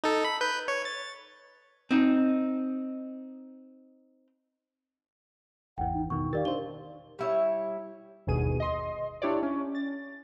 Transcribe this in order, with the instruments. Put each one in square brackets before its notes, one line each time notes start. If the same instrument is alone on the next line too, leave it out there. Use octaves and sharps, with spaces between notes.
[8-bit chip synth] D#4 A4
B5
B4 G6
C#5
A6
[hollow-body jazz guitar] C4 D#4
[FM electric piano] G#1 E2 E3 [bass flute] F#5 [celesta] G5
[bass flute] D#4
[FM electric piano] B2 D#3 [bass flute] D#4 [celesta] C#6
[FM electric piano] D#3 A6 [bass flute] G4 [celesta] A#4 D5 F5
[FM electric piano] D4 D#4 C5 [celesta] G7
[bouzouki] G3 E4 C#5
[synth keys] G1 D#2 B2 G#4 D#7
D#5 C6
D4 E4 G4 C#5 D5
C#4
A6